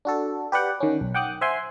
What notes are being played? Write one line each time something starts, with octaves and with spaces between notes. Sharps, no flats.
D4 F#4 A4
G4 B4 D5 F#5 G5
D#3 C#4
B1
F#5 G5 D6 D#6 F#6
C5 E5 F#5 G#5 C6